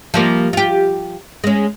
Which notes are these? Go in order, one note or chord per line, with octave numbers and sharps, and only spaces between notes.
F3 G3 A#3
F4 G4
G#3 C#4